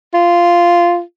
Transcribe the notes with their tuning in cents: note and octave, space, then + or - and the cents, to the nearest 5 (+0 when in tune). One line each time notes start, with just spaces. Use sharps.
F4 -10